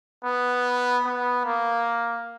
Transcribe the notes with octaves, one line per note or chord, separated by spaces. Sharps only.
B3
B3
A#3